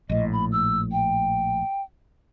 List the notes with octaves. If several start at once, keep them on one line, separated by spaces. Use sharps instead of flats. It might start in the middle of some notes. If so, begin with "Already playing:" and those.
A#1 A2 D#5
B5
E6
G5